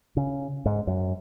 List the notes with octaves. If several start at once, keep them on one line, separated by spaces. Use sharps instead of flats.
C#3
G#2
F#2